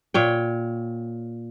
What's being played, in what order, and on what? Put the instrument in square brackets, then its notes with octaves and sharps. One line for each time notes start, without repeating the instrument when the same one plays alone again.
[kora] A#2 C#5 G5